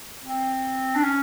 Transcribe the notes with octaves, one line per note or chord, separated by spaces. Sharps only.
C4
D4
C#4